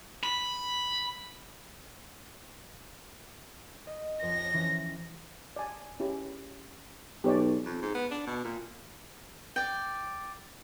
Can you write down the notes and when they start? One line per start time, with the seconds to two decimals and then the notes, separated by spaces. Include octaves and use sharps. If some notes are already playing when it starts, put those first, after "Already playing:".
0.24 B5
3.87 D#5
4.23 F2 A#6
4.53 E3 C#4
5.56 D5 G#5
6.00 C#4 E4 G4
7.24 B1 G4 C#5 D5
7.65 F2
7.82 G#2
7.95 B3
8.11 D4
8.27 B2
8.44 A#2
9.56 D5 G5